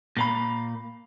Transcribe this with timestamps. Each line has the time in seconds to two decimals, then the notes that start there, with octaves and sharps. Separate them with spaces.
0.17 A#2 A#3 B5